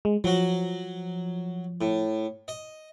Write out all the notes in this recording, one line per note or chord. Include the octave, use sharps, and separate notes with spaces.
G#3
F3 F#3 F#4
A2
D#5